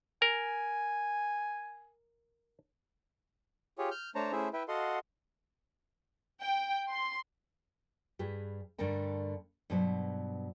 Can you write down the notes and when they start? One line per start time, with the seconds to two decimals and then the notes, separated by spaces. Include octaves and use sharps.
0.22 A#4 G#5
3.78 F4 G4 G#4 C#5
3.91 F6 G6
4.15 A3 D4 C5 C#5 A5 A#5
4.32 A3 C#4 E4 G#4 C5 E5
4.53 E4 B4 E5 G5
4.68 F#4 A4 D#5 F5 F#5 C6
6.41 G5
6.89 C6
8.19 G2 G4 G#4 B4
8.78 G2 D3 A3 A#4 G5
9.70 G2 B2 F#3 C5